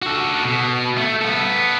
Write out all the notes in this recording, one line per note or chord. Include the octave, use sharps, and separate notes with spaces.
F#4 A4
B2
A3
B3 A4